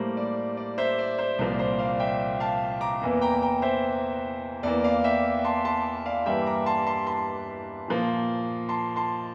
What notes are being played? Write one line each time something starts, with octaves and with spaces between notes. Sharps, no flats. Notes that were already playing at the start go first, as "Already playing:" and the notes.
Already playing: A2 G3 A#3 C5
D5
D5
C5 E5
D5
C5
C2 A#2 F3 A#3 D5
C5
D5 F5
E5 G5
F5 A5
A#5 D6
E2 E3 A#3
G5 A#5
G5 A#5
C5 E5
E2 E3 A#3 D5
D5 F5
E5 G5
A5 C6
A5 C6
D5 F5
G2 E3 G3 A#3 E5 G5
A#5 D6
A5 C6
A5 C6
A5 C6
A#2 F3 A#3
A5 C6
A5 C6